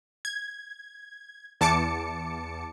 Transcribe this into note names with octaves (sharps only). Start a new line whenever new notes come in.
G#6
E2 A5 D6 C#7